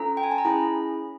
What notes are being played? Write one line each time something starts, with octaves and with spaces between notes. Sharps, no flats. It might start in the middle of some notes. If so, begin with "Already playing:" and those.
Already playing: C#4 F4 A4 A#5
G5
G#5
A5
A#5
C#4 E4 G#4 B5